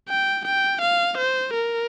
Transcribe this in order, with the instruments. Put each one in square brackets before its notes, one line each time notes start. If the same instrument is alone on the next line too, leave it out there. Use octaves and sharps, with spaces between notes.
[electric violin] G5
G5
F5
C5
A#4